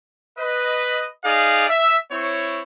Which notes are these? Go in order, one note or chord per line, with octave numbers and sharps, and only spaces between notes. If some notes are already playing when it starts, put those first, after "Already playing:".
B4 D#5
D#4 G#4 D5 F5
E5
C4 E4 C#5